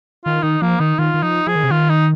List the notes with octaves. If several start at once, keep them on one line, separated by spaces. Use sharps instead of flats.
D#3 F4
D#3 D#4
F3 A#3
D#3 D#4
D#3 F4
D#3
F3 D#4
F3 G#4
D#3
C3
D#3 F4
D#4